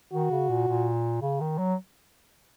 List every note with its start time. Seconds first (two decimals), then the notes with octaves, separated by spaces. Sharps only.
0.13 D#3 F#4
0.31 C#3
0.49 A#2
0.68 A#2
1.22 C#3
1.40 D#3
1.58 F#3